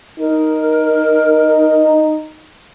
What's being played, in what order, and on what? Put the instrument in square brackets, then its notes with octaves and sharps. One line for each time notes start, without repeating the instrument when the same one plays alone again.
[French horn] D#4 [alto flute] A#4